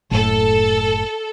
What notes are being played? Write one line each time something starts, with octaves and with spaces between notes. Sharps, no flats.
F#1 A2 A4